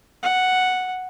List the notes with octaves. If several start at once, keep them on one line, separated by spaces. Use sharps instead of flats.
F#5